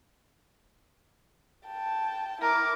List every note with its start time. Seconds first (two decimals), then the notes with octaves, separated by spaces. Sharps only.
1.67 G5 A5
2.41 E4 A#4 D6